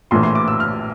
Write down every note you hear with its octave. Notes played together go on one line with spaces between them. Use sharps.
A#1 A2 E3 C6
C6
D6
E6
F6